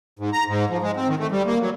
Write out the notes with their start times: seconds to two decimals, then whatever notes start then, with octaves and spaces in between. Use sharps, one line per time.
0.19 G#2
0.33 A#5
0.47 G#2
0.70 F3
0.82 G#3
0.96 C4
1.08 D#3
1.19 A3
1.31 G3
1.46 A#3
1.60 F#3